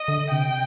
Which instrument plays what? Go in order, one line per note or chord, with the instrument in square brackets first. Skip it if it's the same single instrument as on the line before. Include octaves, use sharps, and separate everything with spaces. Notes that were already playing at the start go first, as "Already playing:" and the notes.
Already playing: [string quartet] D#5
[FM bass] D3
[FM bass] C3 [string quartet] G5